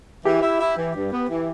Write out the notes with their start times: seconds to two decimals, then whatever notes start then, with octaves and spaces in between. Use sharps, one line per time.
0.25 E3 G4
0.42 E4
0.60 E4
0.77 E3
0.94 G2
1.11 B3
1.29 E3